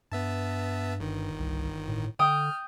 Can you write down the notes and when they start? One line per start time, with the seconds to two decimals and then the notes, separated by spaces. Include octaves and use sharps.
0.12 G2 B3 E5 A5
1.00 G1 D#3
1.39 C2
1.88 A2
2.19 D3 G5 D#6 F6